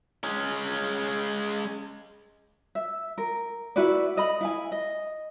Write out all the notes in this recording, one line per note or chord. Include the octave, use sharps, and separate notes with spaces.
G#3 C#4
E5
A#4
E4 F#4 B4 D5
A4 D#5 B5
E4 F5 G#5
D#5